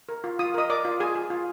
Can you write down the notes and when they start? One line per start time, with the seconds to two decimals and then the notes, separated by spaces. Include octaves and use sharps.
0.09 A#4
0.24 F4
0.39 F4 D#6
0.54 A#4 D#5 D#6
0.70 A#4 D5 D6
0.85 F4
1.00 F4 G#4 G#5
1.15 G#4
1.30 F4